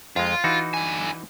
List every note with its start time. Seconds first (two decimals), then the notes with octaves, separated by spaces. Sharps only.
0.16 F2 G#3 F4
0.44 E3 D#4 F#4
0.74 D3 G#5